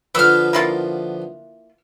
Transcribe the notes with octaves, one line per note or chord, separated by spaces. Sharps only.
D3 F3 B3 B4 E6 F6
A#3 E4 F4